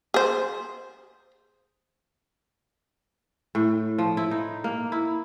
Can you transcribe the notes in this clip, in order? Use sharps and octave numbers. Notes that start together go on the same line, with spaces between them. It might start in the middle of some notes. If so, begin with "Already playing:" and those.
G#4 C5
A2
F3
E4
D#4
A#3
E4